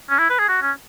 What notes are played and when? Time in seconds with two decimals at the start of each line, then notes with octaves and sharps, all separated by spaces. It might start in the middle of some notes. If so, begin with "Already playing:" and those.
0.10 C#4
0.19 E4
0.30 B4
0.39 G#4
0.49 F#4
0.62 C#4